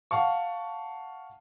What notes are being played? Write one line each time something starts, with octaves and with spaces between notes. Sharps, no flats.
F5 F#5 A5 C#6